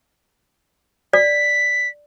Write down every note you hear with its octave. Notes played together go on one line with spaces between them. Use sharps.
D5 B6